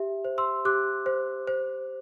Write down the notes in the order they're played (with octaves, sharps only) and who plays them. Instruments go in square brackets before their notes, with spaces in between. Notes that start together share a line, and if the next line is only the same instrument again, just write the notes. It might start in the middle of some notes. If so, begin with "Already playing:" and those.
Already playing: [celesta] G4 E5
C5
C6 E6
G4 D6 F#6
C5
C5